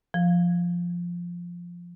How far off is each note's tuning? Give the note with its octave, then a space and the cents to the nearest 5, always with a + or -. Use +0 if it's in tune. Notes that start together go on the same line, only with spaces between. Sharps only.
F3 +0